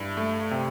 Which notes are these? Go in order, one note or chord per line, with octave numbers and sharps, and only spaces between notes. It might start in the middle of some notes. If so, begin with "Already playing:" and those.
Already playing: G2 E4
A3
C3